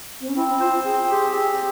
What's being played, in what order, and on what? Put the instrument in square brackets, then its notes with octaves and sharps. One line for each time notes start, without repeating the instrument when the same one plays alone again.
[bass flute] C4
C#4
[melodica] C4 [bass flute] E4
[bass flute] F4 [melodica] C5
[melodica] C4 [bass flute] G#4
[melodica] G4 [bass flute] G#4
[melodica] C4